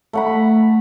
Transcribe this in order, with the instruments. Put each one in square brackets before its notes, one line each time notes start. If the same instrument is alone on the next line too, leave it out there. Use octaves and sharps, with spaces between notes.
[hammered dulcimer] A3 F#5 B5